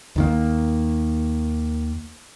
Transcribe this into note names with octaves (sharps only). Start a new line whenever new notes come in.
D#2 D#3 A#3